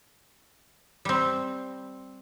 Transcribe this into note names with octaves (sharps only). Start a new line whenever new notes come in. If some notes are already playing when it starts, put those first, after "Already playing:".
G3 C4